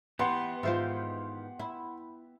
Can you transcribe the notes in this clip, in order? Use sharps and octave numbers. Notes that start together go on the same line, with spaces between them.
E3 B3 G4 F#5 C6
G#2 D#3 E3 F4 C5 E5
E4